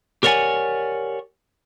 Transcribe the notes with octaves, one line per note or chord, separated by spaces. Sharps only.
G4 A#4 C#5 D5 F#5 G#5